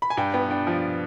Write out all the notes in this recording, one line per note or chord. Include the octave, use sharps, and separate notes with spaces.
B5
G#5
G2 G5
B3 G5
D4 G5
F3